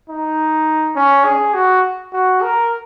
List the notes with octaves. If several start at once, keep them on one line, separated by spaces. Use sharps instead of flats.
D#4
C#4
G#4
F#4
F#4
A#4